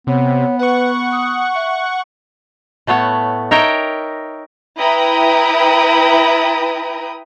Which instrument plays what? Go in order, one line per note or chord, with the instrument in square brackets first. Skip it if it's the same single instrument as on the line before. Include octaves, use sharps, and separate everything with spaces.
[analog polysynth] C3 [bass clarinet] B3 [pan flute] C#5
[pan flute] B4 [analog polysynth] F#5 C#6
[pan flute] D#6
E5
[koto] A2 A3 B3 C#5 F#5
D#4 A#4 C#5 E5 G5 A#5
[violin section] E4 B4 G5 A#5 D#6